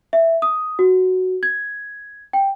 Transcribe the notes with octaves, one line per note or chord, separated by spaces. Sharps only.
E5
D#6
F#4
G#6
G5